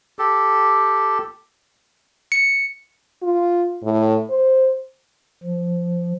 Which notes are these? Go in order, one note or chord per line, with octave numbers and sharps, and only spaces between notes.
G4 A4
C#7
F4
A2
C5
F3